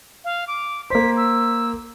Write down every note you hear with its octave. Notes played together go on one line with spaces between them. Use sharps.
F5
D6
A#3 C5 B6
E6